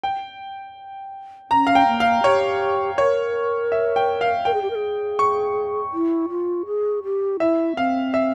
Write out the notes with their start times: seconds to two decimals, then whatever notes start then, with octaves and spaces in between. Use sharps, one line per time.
0.03 G5
1.50 C#4 A#5
1.67 F5
1.75 G5
1.88 A#3
2.00 F5
2.24 G4 C#5
2.98 A#4 C#5
3.72 E5
3.96 G5
4.21 F5
4.45 A#4 G5
4.54 G#4
4.62 G4
4.70 A#4
4.75 G#4
5.19 C#6
5.93 E4
6.29 F4
6.66 G#4
7.04 G4
7.40 E4 E5
7.76 C4 F5
8.14 E5